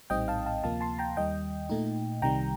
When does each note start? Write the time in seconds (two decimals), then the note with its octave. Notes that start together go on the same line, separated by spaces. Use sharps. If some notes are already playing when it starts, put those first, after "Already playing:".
0.10 A#1 A2 G3 C4 D#4 D#5 G5
0.28 F5 A5
0.46 F5 A5
0.63 D2 C3 F3 A#3 F5 A5
0.81 A5 C6
0.99 G5 A#5
1.17 D#2 D#3 G3 D#5 G5
1.70 A#2 A3 D#4
2.22 C2 C3 D#3 G3 G5 A#5